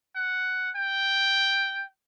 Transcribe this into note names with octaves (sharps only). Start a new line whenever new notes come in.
F#5
G5